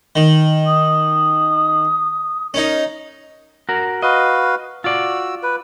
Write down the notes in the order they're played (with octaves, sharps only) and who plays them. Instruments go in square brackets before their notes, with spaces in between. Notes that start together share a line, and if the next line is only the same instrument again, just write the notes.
[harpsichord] D#3
[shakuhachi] D#6
[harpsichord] C#4 D#4 [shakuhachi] A#4
[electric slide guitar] F#4 A#4
[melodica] F#4 B4 F5 [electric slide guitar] D#5
[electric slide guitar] F4 D5 [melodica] F#4 E6
[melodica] B4